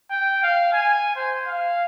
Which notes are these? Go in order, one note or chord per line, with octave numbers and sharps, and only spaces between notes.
G5
F5
G#5
C5
F5